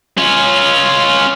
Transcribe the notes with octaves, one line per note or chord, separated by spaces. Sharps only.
C#4 F4